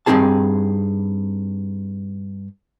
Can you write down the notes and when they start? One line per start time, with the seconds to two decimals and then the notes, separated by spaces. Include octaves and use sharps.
0.06 G2 E3 C4 D#4 G#4 A5